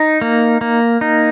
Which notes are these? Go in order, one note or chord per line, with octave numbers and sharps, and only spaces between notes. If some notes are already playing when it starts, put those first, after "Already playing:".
Already playing: D#4
A#3
A#3
D#4